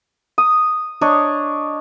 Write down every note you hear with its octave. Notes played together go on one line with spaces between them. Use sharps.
D#6
D4 C#5 D#5